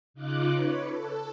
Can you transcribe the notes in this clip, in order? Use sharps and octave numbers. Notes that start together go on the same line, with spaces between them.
C#3 D#4 F4 D6 F#6
B4 C#5
A4